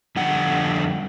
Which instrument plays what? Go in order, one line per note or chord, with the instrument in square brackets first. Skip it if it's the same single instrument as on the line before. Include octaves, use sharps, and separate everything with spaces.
[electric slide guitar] F2 D3 G3 F#5